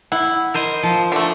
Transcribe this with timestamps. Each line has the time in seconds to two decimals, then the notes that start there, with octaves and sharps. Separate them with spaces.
0.12 E4 F#5
0.54 A#4 C5 D#5
0.83 F3
1.12 D3 A3